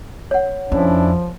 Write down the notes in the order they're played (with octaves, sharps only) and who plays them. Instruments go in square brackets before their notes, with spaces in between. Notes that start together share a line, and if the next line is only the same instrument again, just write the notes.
[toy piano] C#5 F#5
[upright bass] F2 [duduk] F3 [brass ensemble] C#4 D4 E4